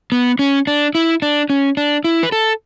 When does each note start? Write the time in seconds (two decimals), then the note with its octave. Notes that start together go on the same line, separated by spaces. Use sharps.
0.12 B3
0.39 C#4
0.67 D4
0.95 E4
1.22 D4
1.50 C#4
1.77 D4
2.04 E4
2.23 B4
2.32 A4